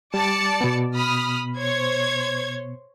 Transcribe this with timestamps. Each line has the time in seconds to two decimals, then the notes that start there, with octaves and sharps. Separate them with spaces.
0.14 G3 D5 A5 C#7
0.61 B2 B3
0.94 B5 D#6 F6
1.58 C5 C#5 G#6